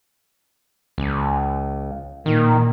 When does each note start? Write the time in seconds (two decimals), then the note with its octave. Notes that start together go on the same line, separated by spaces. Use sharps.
0.98 C#2
2.26 A#2 D#3 A#3